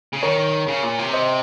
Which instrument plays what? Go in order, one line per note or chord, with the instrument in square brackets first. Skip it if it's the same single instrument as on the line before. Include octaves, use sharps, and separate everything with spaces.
[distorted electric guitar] C#3
[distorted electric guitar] D#3 [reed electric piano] A#4 C#5
[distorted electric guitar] C#3
A#2
C3
[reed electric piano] C5 D#5